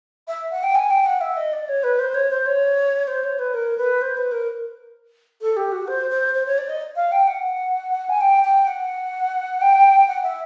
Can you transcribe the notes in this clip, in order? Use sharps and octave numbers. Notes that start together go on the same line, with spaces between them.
E5
F#5
G5
G#5
G5
F#5
E5
D#5
D5
C#5
B4
C5
C#5
C5
C#5
C5
C#5
B4
A#4
B4
C5
B4
A#4
A4
G4
F#4
C5
C5
C5
C#5
D5
D#5
F5
G5
F#5
G#5
G5
G5
F#5
G5
F#5
E5